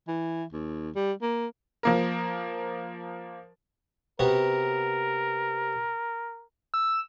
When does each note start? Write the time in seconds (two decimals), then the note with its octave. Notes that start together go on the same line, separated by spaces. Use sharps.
0.08 E3
0.52 D#2
0.96 G3
1.22 A#3
1.83 F3 A#3 A#4
4.19 C3 B3 F#4 A#4
6.74 E6